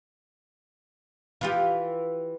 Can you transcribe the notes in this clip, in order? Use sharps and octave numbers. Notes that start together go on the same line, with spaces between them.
E3 F4 G4